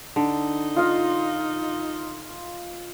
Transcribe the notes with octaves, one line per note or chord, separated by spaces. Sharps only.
D3 D#4
F4 D#5 F5